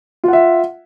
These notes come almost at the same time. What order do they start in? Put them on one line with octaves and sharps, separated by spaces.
F4 F#5 E5